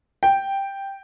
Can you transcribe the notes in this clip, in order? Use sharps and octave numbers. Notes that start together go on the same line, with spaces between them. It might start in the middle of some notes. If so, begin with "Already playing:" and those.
G5